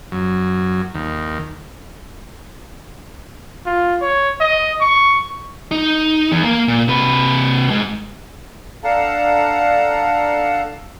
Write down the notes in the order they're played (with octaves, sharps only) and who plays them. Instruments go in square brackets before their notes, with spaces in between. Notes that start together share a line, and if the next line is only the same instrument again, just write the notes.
[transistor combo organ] F#2
D#2
[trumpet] F4
C#5
D#5
C#6
[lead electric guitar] D#4
E2
A#3 A#5
A#2
C3 B4
G#2
[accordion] D4 A4 F5 F#5 A5 A#5